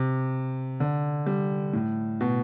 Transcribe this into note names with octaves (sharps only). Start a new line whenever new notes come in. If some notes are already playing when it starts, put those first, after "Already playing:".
Already playing: C3
D3
G3
A2
B2